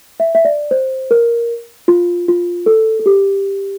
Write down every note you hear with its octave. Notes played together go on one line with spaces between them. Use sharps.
E5
E5
D5
C5
A#4
F4
F4
A4
A4
G4